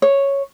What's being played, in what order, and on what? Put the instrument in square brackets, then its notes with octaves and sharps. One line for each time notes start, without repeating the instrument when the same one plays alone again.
[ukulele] C#5